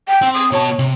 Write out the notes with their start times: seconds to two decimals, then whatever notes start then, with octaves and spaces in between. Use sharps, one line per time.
0.08 G5
0.22 C4
0.34 D#6
0.52 B2 C#5 A5
0.79 C3